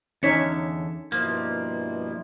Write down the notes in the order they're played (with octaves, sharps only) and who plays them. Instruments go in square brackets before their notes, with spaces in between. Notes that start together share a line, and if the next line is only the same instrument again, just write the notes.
[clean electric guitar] E2 D3 [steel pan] C#4 D#4 C#5 [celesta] G#6 B6 C#7
[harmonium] G2 B2 E4 [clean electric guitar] F3 A#3